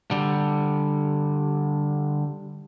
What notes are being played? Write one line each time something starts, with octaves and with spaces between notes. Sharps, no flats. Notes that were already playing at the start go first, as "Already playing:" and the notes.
D3 G3